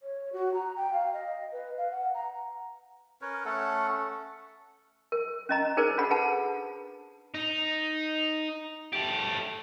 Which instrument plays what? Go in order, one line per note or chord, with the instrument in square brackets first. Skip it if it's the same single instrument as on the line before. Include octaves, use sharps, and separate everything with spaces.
[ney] C#5
F#4
A#5
G5
F5
D#5
B4
F5
F#5
A#5
[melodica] C#4 A#4 B4 C#5
A3 C#4 A4 F#5
[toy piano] A#4
C#4 D#5 A#5
D#4 G#4 A#4 C5 D5
D4 F#4 A4 F#5 B5
G#4 B4 F#5 A5
[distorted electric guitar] D#4
A3 G4